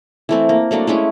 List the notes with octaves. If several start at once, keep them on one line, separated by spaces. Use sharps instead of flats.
E3 A3 C4
A#3
F#3 A3 A#3 D4
G#3 A3 C#4 E4